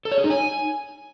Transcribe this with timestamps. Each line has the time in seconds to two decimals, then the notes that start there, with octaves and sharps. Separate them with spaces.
0.05 A4
0.12 C#5
0.18 G#4
0.24 D#4
0.30 G#5